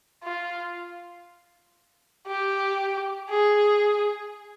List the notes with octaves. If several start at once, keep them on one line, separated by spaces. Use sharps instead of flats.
F4
G4
G#4